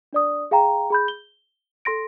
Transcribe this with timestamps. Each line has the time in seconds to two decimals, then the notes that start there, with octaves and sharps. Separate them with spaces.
0.13 D4 D5 D#6
0.51 G#4 F5 G5 A#5
0.90 G#4 B5 G6
1.08 G7
1.85 A4 C6 A#6 D7